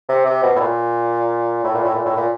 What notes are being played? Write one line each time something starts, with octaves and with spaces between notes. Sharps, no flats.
C3
C3
B2
A2
A#2
A2
A#2
A2
A#2
A2
A#2